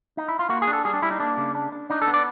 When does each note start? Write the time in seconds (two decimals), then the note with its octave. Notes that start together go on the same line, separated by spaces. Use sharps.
0.17 D#4
0.28 E4
0.39 F4
0.49 A#3 F#4
0.62 G#4
0.67 D4
0.73 A4
0.85 G3 G#4
0.94 D4
1.02 G3 E4
1.11 D#4
1.20 A#3 D4
1.37 C#3
1.55 D4
1.72 D4
1.90 D4 D#4
2.02 A4
2.07 B3
2.14 D5